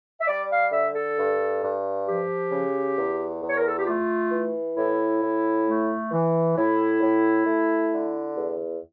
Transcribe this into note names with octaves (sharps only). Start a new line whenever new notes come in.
E5
G3 D5
F5
D3 E5
A4
G2
G2
F3 G4
C#3
E2
E2
C#5
A#4
A4
G4
A3 F4
E3
A2 E4
A2
A3
E3
A2 E4
A2
A3
D3
E2